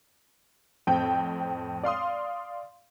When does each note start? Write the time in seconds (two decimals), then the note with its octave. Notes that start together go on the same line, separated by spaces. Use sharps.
0.87 F2 A2 C4 G5
1.83 D5 F5 C6 D#6